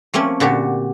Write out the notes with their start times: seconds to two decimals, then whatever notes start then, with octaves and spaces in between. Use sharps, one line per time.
0.14 F3 A3 A#3 C4 C#4
0.40 A#2 D3 F#4 G4